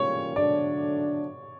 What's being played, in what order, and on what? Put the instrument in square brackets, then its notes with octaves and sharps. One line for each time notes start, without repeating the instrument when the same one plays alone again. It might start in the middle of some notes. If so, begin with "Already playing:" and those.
Already playing: [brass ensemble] E3 G3 A#3 C#4 F4 [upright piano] C#5
[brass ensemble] D3 F#3 A3 D4 [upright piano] D5